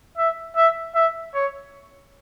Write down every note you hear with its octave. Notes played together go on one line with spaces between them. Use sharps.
E5
E5
E5
C#5